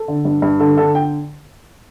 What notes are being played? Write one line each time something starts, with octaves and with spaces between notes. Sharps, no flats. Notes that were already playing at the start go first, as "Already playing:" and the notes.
Already playing: A4
D3
G2
G2
D3 A4
D3 A4
G5